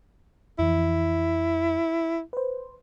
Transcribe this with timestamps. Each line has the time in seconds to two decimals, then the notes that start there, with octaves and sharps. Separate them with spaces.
0.59 F2 E3 E4
2.33 B4 C5